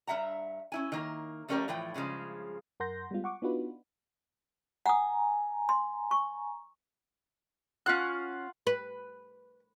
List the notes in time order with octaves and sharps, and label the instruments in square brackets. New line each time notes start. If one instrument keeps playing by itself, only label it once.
[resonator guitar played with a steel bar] G2 A3 E5 F#5 A#5
C#4 E4 G#5
D#3 A#3 A#4
F2 A3 C#4 G4 A#4 D5
A2 E3 F3 G5
G2 C#3 F3 G#3
[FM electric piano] F#2 A#4 F#5 C6 G6 A#6
G3 G#3 B3 F4
F#5 C#6 D6
B3 D4 D#4 F4 F#4 B4
[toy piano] F#5 D#6 [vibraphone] G#5 A#5
[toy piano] C6
C#6
[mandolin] C#4 F#6 [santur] F4 F5 F#5
[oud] B4